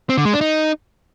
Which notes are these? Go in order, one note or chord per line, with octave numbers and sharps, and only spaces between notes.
C4
D3
G#3
D4
D#4